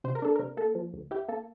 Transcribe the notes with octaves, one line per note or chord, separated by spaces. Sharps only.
C3 C5
A#4
D4 A4
A#4
C3
A#3 A4
F3
D2
E4 G4
A#3 A4